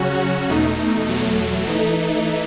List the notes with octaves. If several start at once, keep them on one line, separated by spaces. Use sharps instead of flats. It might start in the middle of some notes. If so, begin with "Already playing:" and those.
Already playing: C#3 F#3 C#4 F#4
E2 B2 A3 D#4
E2 B2 F#3 A3
E3 A3 D#4